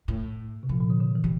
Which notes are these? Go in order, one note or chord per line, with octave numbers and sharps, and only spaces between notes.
A2
C3
A#2 F3
A#2
D3
D3
E3
G3